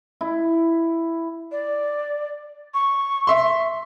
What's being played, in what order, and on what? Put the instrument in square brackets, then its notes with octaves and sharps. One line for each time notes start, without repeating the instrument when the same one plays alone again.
[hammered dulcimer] E4
[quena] D5
C#6
[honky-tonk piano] E5 C6